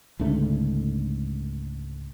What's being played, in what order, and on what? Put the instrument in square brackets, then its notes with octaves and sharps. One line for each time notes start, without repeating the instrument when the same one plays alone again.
[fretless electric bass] C#2 G#2 D3 A3